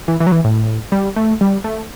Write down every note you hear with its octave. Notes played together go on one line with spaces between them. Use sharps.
E3
E3
F#3
E3
A2
G3
A3
G3
A3